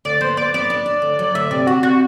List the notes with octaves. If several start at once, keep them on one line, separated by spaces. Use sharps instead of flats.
D2 D5
B3 C5
B3 D5
B3 D5
D4
D4
D2
F#3
D2 E5
C3 D5
D4 F#4
C3 F#4